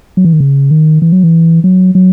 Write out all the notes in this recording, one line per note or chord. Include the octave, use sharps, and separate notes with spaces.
F#3
E3
D#3
C#3
D#3
E3
F#3
E3
F#3
F#3